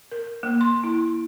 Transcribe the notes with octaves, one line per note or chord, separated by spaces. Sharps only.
A#4
A#3
C6
E4